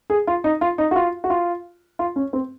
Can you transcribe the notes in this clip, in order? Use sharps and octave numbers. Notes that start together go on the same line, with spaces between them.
G#4
F4
D#4
F4
D#4
F#4
F4
F#4
F4
F4
C#4
C4